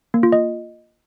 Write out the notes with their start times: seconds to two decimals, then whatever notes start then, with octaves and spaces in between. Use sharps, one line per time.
0.14 A#3
0.23 F4
0.32 D#5